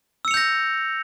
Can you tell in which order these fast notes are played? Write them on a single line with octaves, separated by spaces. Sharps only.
E6 C#7 F7 G6 A#6